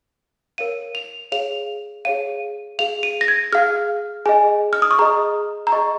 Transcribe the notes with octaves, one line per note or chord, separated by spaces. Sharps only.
A#4 C#5 F5 D#7
F7
G#4 C#5 F5 F7
G#4 C#5 F5 D#7
G#4 F5 F7
D#7
A#6
G#6
G#4 F5 F6
G#4 D#5 G#5
F6
D#6
C#6
G#4 D#5 A#5
A#5
G#4 D#5 C#6